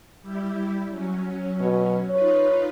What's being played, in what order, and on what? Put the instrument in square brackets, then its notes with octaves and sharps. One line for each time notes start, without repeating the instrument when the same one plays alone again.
[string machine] G3 E4 G4
F#3 C#4
[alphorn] B2
[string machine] D#4 F4 B4 [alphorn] C#5